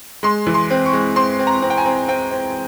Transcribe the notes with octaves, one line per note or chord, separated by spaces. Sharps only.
G#3 C6
E3
C6
C4
C#6
G#3
C4 C6
C4
A#5
C4
G5
G#5
C4
C4 G5
C4